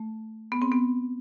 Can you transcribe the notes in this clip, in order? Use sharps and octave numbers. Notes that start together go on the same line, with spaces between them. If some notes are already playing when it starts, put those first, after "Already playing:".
Already playing: A3
B3
C4
B3